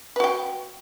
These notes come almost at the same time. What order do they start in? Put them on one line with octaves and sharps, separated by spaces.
B4 F#4 G5